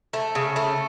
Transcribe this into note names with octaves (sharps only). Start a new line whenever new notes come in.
A3
C#3
A3